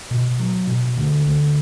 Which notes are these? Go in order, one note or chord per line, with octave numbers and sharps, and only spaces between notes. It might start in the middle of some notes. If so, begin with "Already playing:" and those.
B2
F#3
B2
D2
D2